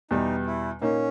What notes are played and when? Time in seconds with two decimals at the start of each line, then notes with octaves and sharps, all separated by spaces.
0.11 E2 B2 G3 D#4
0.46 E4
0.81 A#2 A#3 C#4 D#4